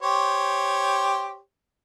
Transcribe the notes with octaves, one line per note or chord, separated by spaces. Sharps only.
G4 C5 C#5